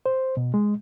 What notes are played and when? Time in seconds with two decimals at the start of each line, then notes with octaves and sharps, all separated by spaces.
0.06 C5
0.37 B2
0.54 G#3